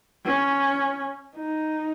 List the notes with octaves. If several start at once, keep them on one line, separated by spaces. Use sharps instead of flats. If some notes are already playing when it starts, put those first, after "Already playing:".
C#4
D#4